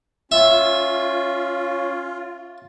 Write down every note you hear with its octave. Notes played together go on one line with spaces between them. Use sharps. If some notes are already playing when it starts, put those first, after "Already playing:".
C#4 F4 E5